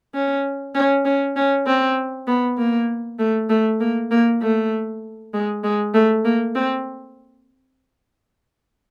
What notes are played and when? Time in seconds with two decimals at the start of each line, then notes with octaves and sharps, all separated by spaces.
0.14 C#4
0.75 C#4
1.05 C#4
1.36 C#4
1.67 C4
2.27 B3
2.58 A#3
3.19 A3
3.49 A3
3.80 A#3
4.11 A#3
4.42 A3
5.34 G#3
5.64 G#3
5.94 A3
6.25 A#3
6.55 C4